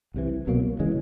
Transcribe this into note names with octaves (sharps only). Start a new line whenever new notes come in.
C2 C3 E3
C2 B2 F#3 A#3
C#3 E3 G#3